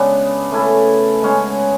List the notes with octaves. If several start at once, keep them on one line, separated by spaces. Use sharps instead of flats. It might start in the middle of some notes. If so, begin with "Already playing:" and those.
Already playing: C#3 G#3 B3 D4
A3 C#4 E4 A4
G#3 C#4 F#4 C#5